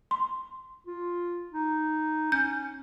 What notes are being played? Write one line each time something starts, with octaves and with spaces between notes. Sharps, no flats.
C6
F4
D#4
C#4 G6